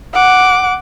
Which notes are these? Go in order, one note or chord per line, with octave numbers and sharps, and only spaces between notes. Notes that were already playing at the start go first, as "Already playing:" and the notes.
F#5 D6